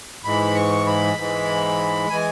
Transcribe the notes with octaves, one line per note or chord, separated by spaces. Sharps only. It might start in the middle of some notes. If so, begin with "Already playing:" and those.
G#2 E3 G#3 B5
C#6
B5
G#2 E3 G#3
E3 G#3 G#5